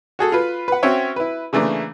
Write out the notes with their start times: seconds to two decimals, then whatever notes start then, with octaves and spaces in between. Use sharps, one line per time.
0.19 F#4 G#4 A4
0.32 F4 B4
0.68 B4 F#5
0.83 C4 C#4 F#4 C#5 E5 G5
1.16 E4 B4
1.53 C#3 E3 A3 A#3 D4